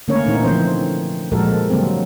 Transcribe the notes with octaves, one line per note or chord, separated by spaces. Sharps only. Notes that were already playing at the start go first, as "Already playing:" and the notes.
D3 A3 A#3 C#4 A#4 C#5
A#2 E3 C4 D#4
D3 F3 C4 C5
A#2 F3 G#3 F#4 A4 A#4
D3 F#3 G3 A#3 C4